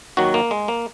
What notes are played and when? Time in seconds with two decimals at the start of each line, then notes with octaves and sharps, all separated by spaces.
0.17 D#2 D#3 F#3 F#4
0.34 A#3
0.51 G#3
0.68 A#3